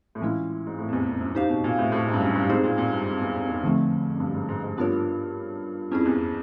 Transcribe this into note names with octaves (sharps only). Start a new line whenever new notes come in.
A2
A#2 E3 G#3 C#4 E4
G#2
A2
F2
E2
F2
F#2
D#4 G4 C5 F5
B2
A#2
A2
A2
G#2
G2
F#2
G2
G#2 G#3 C4 D#4 G#4 C5
A#2
A#2
G2
F2
E2
F2
E2
F2 D3 F3 A3 C4
F#2
G2
G#2
G#2
G#2
G2 B3 D4 F4 A#4 C#5
F2 C#4 E4 G#4
E2